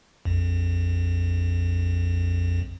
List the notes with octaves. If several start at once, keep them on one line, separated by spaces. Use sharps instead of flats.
A#1 F2